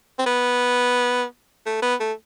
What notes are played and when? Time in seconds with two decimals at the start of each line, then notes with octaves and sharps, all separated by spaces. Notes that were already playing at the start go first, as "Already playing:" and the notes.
0.19 C4
0.26 B3
1.66 A3
1.82 B3
2.00 A3